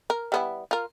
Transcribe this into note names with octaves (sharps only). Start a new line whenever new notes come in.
A#4
G3 B3 E4
F4 A#4